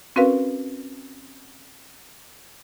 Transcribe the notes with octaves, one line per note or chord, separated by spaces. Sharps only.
C4 C#4 F#4 A#4 B4 F5